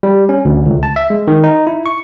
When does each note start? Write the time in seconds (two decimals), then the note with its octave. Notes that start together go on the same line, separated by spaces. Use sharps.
0.03 G3
0.29 C#4
0.45 D2
0.66 C#2
0.83 A5
0.96 E5
1.10 G#3
1.27 D#3
1.44 D#4
1.67 E4
1.86 C#6